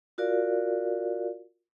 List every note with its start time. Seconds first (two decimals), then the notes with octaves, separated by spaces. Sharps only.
0.18 F4 F#4 A#4 D5 F5